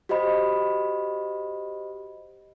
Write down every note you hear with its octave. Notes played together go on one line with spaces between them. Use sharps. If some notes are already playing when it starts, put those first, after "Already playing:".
F#4 G4 C5 D#5 B5